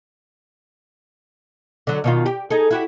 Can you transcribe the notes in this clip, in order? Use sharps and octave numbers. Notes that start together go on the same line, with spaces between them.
D3 F#3
B2 D#3 F4
G4
D#4 G#4 A4
E4 F#4 G4